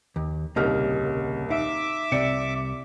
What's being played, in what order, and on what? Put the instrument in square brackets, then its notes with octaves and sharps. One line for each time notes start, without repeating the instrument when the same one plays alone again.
[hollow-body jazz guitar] D#2
[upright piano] D#1 C2 F6 [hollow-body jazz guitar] C#3 A#3 D#4
[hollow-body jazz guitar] D#4 F5 [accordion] E5 D6
[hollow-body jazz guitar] C2 C3 [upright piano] D5 C#7